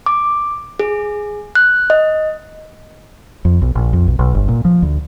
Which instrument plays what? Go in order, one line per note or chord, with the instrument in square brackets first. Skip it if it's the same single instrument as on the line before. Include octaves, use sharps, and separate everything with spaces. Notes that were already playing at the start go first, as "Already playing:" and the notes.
[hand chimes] D6
G#4
F#6
D#5
[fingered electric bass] F2
B1
A#1
F2
B1
B1
G1
A#2
F3
D2